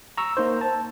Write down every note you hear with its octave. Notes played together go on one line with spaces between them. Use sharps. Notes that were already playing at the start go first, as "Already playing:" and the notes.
A#5 C#6 E6
A#3 D#4 C5
A5